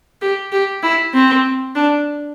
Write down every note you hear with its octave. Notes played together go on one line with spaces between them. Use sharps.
G4
G4
E4
C4
D4